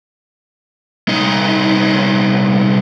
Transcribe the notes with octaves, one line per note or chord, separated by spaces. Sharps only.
C2 D#4